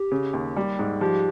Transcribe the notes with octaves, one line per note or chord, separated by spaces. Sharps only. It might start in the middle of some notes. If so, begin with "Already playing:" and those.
Already playing: G4
C#3
D#2
G3
G#2
F3 G4